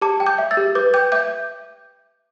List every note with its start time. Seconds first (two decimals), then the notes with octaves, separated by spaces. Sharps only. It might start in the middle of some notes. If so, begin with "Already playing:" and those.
0.01 G4 A5 D6
0.20 G5
0.26 D6 G6
0.38 E5
0.51 E6 A6
0.57 G4
0.75 B4 D6 G6
0.94 G5 D6 G6
1.12 E5 D6 G6